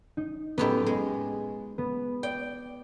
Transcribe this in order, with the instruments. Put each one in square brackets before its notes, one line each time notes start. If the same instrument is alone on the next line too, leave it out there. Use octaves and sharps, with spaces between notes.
[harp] D#4
[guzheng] F#2 A2 G4 [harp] B3 D#5
[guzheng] G#3 [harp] B3
[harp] B3
[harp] D5 [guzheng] G5